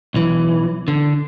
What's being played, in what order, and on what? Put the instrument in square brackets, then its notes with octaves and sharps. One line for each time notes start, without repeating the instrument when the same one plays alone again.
[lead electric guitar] B1 E3
D3